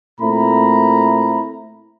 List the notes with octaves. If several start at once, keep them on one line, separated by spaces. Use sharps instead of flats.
A#2 A3 C4 E4 A#5 B5